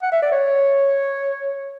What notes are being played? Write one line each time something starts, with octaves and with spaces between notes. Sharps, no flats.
F#5
E5
D5
C#5